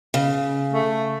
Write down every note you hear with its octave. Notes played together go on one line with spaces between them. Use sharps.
C#3
A3